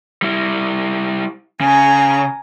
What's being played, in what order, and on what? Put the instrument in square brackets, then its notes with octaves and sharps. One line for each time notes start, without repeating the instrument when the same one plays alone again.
[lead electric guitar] G3 E4
[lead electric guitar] C#3 [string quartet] G#5 A#5